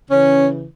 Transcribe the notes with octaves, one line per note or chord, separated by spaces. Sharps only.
C#3 E3 C#4